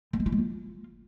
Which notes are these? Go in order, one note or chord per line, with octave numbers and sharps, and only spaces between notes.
G3
G#3
E4
G#3
F4